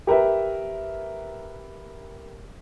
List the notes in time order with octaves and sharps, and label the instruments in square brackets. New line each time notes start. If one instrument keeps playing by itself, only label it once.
[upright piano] G4 A#4 B4 E5